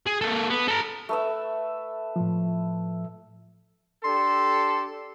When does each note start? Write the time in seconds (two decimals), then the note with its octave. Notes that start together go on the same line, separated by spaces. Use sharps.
0.06 G#4
0.21 A#3 A4
0.50 B3
0.68 A4 A#5
1.09 A3 B4 E5
2.16 A2 F3
4.04 D4 G4 A4 C6